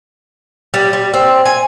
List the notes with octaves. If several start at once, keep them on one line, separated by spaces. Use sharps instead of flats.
G3
G3
C4
G#5